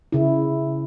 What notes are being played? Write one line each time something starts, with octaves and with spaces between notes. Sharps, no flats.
C#3 E4